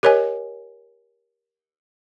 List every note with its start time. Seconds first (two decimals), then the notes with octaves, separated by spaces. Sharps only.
0.03 G4 A#4 C#5 D#5 G#5